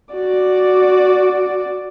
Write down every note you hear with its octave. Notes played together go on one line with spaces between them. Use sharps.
F#4 D5